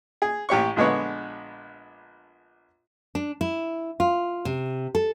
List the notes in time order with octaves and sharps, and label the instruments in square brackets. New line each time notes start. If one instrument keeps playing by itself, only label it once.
[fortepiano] G#4
A1 G4 C#5 C#6
A#1 D3 G#3 B3 C#5
[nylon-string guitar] D4
E4
F4
C3
A4